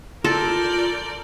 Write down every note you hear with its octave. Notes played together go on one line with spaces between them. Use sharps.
F4 A4 A#4 D5 G6